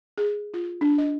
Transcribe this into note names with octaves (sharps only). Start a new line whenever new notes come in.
G#4
F4
D4
D#5